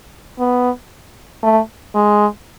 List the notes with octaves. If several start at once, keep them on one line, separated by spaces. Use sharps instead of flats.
B3
A3
G#3